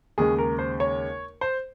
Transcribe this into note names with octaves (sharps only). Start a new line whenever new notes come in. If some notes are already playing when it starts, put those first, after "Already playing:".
D#2 C#3 G#3 G#4
A#4
C5
C#5
C5